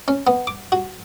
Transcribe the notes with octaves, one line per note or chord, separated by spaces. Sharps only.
C#4
B3
D6
F#4